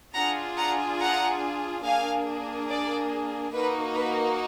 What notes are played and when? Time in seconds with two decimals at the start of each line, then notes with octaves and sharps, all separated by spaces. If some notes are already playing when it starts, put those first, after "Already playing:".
0.15 D4 F4 G#4 F#5 A#5
0.57 F#5 A#5
0.99 F#5 A#5
1.84 A#3 D4 G#4 F5 G#5
2.68 D5
3.53 A#3 D#4 F#4 B4
3.95 B4